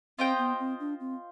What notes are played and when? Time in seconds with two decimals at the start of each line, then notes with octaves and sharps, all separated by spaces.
0.19 C4 F4 C5 D#5 G5
0.38 B3
0.60 C4
0.80 D4
1.00 C4